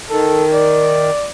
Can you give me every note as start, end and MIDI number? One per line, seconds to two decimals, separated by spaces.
0.10 1.11 51
0.10 0.44 69
0.53 1.31 74